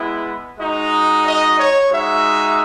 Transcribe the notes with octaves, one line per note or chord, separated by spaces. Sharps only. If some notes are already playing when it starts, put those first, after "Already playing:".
Already playing: G#3 B3 E4
G#3 D#4 F#4 D#5
D#5
C#5
G#3 D#4 F#4 E5